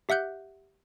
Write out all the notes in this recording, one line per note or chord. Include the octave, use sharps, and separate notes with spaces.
G4 E5 F#5 F#6 G6